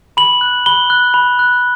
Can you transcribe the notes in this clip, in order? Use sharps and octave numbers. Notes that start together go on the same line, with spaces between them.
B5 F#7
F#6
B5 G7
F#6
B5
F#6